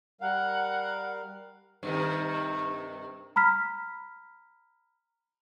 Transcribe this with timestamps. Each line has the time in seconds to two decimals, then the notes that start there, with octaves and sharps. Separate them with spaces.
0.21 G3 A#4 F5 F#5
1.83 G2 C3 D#3
3.36 A#5 B5 F6 B6